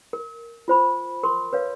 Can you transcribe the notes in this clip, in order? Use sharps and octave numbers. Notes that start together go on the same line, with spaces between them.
A#4
F4 C5 B5
A#4 C6 C#6
B4 C#5 F5